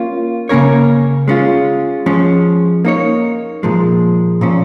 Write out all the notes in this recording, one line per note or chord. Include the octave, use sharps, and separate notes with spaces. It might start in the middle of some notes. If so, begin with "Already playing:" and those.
Already playing: A#3 C#4 F4
C#3 A#3 C#4 A#4 C#5
G#3 C#4 F4
F3 G#3 C#4
A#3 D#4 C#5
A#2 F3 G#3
A#2 F3 C#4